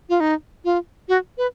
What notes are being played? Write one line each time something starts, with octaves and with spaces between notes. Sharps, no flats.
F4
D#4
F4
F#4
B4